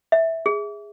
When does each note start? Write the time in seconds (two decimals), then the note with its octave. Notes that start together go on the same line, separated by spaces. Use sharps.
0.12 E5
0.46 G#4